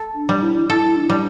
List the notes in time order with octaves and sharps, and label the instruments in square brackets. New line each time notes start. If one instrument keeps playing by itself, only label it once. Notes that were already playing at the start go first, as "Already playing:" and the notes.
Already playing: [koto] A4
[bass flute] D4
[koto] G3
[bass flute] E4
[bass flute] E4 [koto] A4
[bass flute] D4
[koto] G3